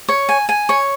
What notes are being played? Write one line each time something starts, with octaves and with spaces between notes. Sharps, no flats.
C#5
G#5
G#5
C#5